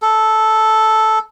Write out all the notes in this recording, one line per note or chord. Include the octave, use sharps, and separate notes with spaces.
A4